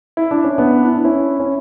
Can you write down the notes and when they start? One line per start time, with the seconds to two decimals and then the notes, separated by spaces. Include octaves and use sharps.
0.17 E4
0.31 D4
0.44 C#4
0.58 B3 D4
0.84 E4
0.94 D4
1.04 C#4 E4
1.40 C#4